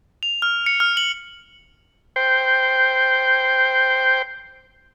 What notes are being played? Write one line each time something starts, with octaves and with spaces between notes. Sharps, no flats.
F7
F6
C#7
F6
F#7
C5 G5